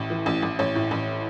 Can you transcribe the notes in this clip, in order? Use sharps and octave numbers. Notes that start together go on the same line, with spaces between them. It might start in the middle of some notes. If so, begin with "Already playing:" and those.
Already playing: A1 A2
E3
A1
A1
A1 C#5
A2
A1